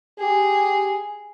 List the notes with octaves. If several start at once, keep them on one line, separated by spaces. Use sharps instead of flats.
G4 G#4